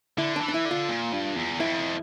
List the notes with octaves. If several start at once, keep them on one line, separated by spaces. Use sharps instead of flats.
D3 E4
D4
E3
D4
E4
D3
F4
A#2
G2
E2
F2 E4